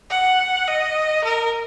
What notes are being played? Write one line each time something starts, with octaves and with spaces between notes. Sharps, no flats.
F#5
D#5
A#4